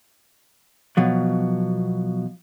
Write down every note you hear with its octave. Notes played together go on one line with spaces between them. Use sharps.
B2 F3 F#3